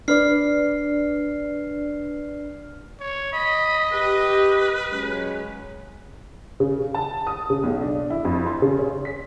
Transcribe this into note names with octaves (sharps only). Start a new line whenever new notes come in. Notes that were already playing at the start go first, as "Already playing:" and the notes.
D4 B4 D5 F6 C7
C#5
D#5 B5
G4 B4
F#3 G#3 C#4
C#3
A5
D#6
C#3
B1
D4
E4
F2
C6
C#3
C#4
B6